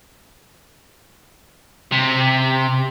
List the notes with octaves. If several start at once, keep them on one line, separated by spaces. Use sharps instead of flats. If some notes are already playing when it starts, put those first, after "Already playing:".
C3